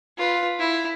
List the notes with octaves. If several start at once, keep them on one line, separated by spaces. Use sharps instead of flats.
F4 B4
E4